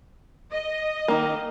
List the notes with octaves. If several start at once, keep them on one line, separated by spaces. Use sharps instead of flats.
D#5
D#3 A#3